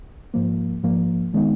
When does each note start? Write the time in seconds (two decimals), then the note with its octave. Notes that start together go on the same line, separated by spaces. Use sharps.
0.34 G#2 F3 A#3
0.83 G#2 F3 A#3
1.34 D#3 G#3 B3 D#4